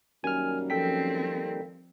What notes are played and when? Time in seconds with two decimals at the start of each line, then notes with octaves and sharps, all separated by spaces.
0.24 F#2 D#3 G3 A#3 G#5 F6
0.70 F3 C4 A4 G5 B6